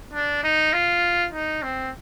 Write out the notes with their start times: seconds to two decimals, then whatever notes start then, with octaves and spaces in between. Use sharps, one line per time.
0.13 D4
0.43 D#4
0.73 F4
1.33 D#4
1.63 C4